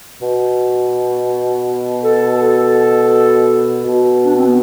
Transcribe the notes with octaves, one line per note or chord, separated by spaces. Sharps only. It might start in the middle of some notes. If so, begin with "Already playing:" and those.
B2
A4
B2
D4
C4
B3